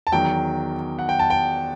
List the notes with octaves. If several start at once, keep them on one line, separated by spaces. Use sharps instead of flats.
A5
E2 D#3 F#3 G5
F#5
G5
A5
G5